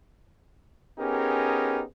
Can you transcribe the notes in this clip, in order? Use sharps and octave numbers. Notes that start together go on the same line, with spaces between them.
B3 C#4 D#4 G4 G#4 A#4